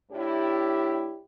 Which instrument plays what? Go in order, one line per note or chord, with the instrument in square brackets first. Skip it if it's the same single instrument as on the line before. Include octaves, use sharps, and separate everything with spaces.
[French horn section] A2 D4 E4 G4